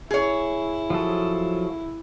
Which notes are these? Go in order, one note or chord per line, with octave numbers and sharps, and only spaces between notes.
E4 G#4 C#5
F3 F#3 A4